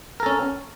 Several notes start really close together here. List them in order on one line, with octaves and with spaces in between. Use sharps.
A#4 A4 C#4